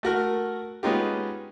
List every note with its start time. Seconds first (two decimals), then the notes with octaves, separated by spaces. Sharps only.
0.03 A3 F#4 A#4
0.83 G#3 B3 C#4 D#4 F4 G4